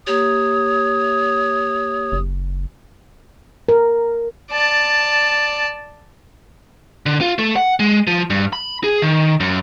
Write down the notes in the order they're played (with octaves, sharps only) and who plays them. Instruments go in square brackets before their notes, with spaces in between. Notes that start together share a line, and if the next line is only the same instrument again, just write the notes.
[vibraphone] A#3 G4 [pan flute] C#5 [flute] D#6
[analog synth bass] F#1
[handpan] A#4
[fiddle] D5 A5
[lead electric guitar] D3
F4
A3
F#5
G#3
F3
G2
B5
G#4
D#3
F#2